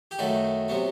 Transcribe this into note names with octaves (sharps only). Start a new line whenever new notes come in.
G4
F#2 D#3 F#3 A3 F#4
C3 F#3 B3